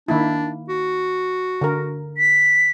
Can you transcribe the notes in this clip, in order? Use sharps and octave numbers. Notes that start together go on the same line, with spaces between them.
D#3 A#3 D4 E4
F#4
D3 A#4
B6